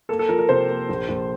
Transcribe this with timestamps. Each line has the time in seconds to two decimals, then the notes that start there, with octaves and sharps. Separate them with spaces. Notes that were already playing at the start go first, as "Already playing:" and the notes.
0.09 A#3 A4
0.19 A4
0.29 F3 A#4
0.39 A#4
0.49 C3 C5
0.69 A#3
0.89 A#1
1.09 A#1